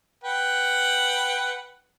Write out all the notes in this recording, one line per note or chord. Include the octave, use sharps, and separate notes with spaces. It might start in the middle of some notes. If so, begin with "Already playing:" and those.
B4 F#5 G5